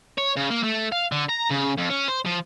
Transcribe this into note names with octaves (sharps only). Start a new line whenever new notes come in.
C#5
C#3
A#3
A3
F5
D3
A#5
C#3
F2
C#4
C5
F3